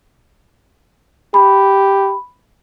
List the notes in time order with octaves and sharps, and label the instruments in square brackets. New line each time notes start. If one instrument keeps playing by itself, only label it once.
[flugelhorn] G4 [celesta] B5